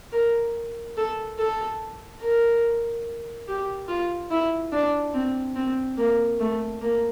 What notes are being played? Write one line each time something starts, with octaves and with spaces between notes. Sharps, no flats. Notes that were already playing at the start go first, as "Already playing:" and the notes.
A#4
A4
A4
A#4
G4
F4
E4
D4
C4
C4
A#3
A3
A#3